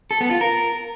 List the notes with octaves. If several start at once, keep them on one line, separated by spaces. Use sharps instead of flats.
A4
B3
F4
A#4